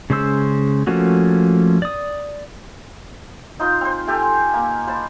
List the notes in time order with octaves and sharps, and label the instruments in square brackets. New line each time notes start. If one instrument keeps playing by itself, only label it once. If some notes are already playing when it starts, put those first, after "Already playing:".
[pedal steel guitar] C#3 G#3 C#4 C5 E6
F3 A3 A#3 C#4 F#4
D5 D#6
[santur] D#4 F4 C6
C4 C5
G4 A4 G5 G#5
A#3
C5 A5 B5